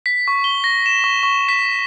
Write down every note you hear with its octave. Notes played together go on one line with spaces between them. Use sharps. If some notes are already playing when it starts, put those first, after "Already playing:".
B6
C#6
G7
A#6
E7
C#6
C#6
B6